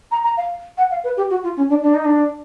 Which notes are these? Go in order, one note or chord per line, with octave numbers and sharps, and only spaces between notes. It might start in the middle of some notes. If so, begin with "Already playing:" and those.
A#5
A#5
F5
F#5
F5
B4
G4
F#4
F4
C#4
D4
D4
D#4
D4